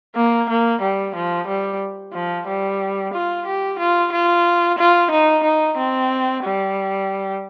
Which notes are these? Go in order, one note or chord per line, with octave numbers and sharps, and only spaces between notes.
A#3
A#3
G3
F3
G3
F3
G3
F4
G4
F4
F4
F4
D#4
D#4
C4
G3